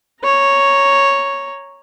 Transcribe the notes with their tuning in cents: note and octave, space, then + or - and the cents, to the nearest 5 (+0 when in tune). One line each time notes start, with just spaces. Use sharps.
C#5 +0 A#5 +0